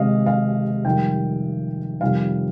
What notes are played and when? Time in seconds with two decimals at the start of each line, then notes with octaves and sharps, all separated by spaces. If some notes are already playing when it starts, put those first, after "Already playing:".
Already playing: C3 D#3 G#3 D#5 F5
0.26 F5
0.84 F2 C3 D#3 G3 G5
2.01 F2 C3 D#3 G3 F5